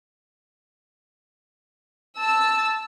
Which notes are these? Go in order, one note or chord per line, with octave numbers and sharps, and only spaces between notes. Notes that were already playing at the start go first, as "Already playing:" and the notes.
A5 E6